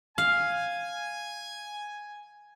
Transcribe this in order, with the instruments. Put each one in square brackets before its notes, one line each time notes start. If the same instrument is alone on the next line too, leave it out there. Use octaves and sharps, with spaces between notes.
[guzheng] F5 [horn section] G#5